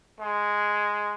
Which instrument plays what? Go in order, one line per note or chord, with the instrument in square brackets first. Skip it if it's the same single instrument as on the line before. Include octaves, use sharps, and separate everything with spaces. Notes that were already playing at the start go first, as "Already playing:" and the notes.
[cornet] G#3